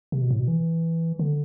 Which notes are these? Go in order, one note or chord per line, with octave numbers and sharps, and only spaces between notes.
C3
B2
A2
B2
E3
D3